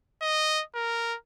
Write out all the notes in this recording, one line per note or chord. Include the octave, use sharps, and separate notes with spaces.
D#5
A#4